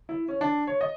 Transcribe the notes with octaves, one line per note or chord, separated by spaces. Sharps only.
E4
C#4
D4
C#5
D#5